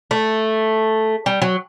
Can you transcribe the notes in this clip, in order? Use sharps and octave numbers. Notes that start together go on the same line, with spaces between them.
A3
G3
F#3